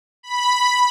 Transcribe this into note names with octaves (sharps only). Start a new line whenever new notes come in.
B5